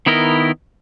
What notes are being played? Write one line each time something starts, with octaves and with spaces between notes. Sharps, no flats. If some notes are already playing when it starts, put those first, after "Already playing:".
D#3 B3 E4 A#4 D#5